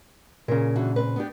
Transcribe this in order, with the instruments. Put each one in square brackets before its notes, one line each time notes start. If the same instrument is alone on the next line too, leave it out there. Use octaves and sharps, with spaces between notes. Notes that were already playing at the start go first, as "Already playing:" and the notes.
[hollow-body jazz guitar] A#2 C#3 [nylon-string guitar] A#4
[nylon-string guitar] D3 E3 F#4
C4 B4
B3 D4 G4